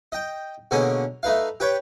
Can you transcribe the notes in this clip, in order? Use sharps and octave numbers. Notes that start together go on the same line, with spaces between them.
D#5 G5
B2 D3 G#3 A#3 C#4 D#6
A3 D#4 B4 F5
G4 B4 C#5 G5